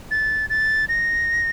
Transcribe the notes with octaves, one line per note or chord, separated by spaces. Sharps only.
A6
A6
A#6